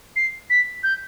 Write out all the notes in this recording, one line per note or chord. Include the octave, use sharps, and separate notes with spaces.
C7
B6
G6